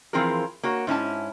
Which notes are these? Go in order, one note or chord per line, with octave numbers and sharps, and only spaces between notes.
E3 F3 C4 F4 G#4 A#4
A#3 F#4 C#5
G#2 C#4 E4 A5